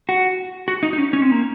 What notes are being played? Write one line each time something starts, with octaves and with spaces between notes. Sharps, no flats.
F#4
F#4
D#4
D#4
C#4
C#4
C4
A#3